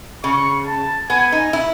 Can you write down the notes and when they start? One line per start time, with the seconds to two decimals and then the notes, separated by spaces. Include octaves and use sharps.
0.24 C#3 C#6
0.67 A5
1.10 B3 G#5
1.32 D#4
1.53 E4